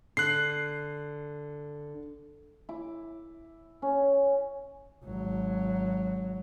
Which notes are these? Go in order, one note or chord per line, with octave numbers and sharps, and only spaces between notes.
D3 F#6 C7
E4 D6
C#4
G#1 F#3